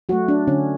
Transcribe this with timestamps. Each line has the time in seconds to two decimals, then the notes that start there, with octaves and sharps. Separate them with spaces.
0.09 F#3 A3 F#4
0.28 D4
0.48 D3 C#4